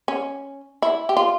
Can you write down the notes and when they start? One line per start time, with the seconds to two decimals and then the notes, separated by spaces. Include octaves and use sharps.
0.08 C#4
0.82 E4
1.09 G4
1.17 F4